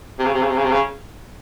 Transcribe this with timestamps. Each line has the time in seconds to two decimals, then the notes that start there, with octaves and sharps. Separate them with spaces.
0.19 C3
0.25 C#3
0.34 C3
0.41 C#3
0.48 C3
0.56 C#3
0.64 C3
0.71 C#3